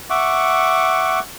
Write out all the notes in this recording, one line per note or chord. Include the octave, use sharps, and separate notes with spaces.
E5 F#5 C#6 D6